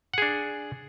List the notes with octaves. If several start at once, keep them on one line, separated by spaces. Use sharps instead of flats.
D4 G#4 F#5